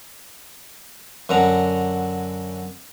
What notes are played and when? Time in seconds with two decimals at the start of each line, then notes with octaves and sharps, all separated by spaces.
1.29 F#2 D3 F#5 A#5